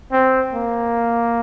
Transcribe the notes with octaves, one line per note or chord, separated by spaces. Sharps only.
C4
A#3